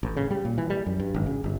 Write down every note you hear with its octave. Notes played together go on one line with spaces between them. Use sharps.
A1
C#3
G3
A#2
E3
G3
F#2
G2
G#1
C#3
G1